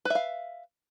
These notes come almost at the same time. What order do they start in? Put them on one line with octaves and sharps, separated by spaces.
B4 E5 F5